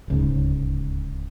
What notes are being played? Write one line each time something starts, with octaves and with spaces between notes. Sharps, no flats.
D1 C#2 G#2